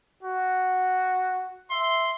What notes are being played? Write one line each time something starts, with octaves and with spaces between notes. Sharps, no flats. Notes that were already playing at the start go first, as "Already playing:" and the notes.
F#4
E5 C6